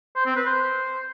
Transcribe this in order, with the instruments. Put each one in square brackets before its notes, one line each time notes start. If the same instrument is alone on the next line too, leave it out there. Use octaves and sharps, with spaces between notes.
[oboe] C5
C4
B4
C5